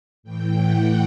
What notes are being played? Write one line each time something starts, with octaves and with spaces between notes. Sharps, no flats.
A2 E3 G5
F#5